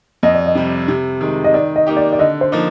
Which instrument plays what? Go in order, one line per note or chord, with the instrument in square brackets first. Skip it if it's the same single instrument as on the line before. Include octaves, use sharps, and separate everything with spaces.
[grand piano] F2 [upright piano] D#5
[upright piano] D5
D#5
[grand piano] C3 G3
C3
D#3 G#3
[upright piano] D#5
[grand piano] D#3 [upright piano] D5
[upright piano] D#5
[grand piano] A#3 D#4 G4
[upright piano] D5
D5
[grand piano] D3 [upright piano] D#5
[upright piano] C5
[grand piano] F3 A#3 D#4